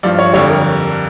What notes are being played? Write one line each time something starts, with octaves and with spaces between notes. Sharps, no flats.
G2 F3 D5
C#5
F2 D3 G3 C#5
A#4